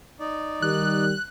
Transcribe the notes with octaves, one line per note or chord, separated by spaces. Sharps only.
D#4 D5
D#3 G3 F#6